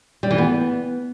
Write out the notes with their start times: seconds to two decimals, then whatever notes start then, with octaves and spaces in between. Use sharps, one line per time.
0.23 G3
0.31 E3
0.38 B3